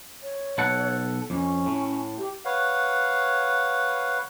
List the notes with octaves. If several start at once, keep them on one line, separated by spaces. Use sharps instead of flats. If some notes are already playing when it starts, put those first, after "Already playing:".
C#5
B1 A4 F#5
F2 C#4
A2
G4
B4 C#5 F5 F#5